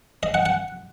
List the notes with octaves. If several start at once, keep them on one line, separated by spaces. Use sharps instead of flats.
D#5
F#5
F#5